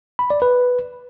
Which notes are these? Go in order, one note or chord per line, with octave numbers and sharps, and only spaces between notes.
B5
D5
B4